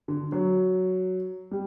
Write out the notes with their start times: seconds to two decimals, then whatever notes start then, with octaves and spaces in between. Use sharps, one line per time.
0.08 D3
0.32 F#3
1.51 G3